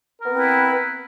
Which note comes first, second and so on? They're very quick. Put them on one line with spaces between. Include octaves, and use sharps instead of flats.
A#4 B3 C4 B4 E4